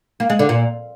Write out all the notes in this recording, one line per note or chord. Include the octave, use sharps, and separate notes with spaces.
A#3
G#3
D3
A#2